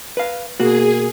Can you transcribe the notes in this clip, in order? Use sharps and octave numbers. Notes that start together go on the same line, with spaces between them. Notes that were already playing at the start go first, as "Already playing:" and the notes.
B4 F5
B2 A#3 F#4 G#4